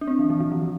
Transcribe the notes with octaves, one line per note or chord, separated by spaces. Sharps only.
D4
C4
E3
E3
E3
F3